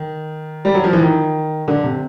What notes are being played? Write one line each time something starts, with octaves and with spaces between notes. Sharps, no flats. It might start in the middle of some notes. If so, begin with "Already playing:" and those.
Already playing: D#3
G3
F#3
F3
E3
D#3
D3
C3